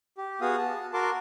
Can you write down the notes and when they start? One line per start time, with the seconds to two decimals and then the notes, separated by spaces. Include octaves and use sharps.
0.18 G4
0.41 B3 F#4 G#4 F5 D#6
0.58 A5
0.94 F#4 A#4 A5 C6 D6